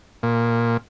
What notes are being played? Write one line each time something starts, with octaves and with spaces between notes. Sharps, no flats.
A#2